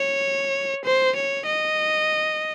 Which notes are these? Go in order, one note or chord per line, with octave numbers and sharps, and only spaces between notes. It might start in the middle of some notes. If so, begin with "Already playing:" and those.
Already playing: C#5
C5
C#5
D#5